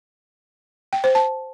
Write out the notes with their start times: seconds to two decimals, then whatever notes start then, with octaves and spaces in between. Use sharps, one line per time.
0.93 G5
1.04 C5
1.15 A5